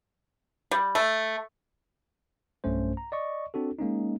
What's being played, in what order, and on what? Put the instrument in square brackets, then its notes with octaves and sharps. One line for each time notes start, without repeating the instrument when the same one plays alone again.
[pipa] G3
A3
[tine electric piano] B1 G2 A3 C#4 C5
A#5
D5 D#5 C#6
C4 D4 F#4 A4
G#3 A#3 C#4 D#4